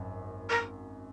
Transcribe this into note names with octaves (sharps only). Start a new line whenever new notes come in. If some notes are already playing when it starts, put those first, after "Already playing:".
Already playing: G#1 F#2
A#4